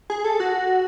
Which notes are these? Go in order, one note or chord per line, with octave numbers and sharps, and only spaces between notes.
G#4
A4
F#4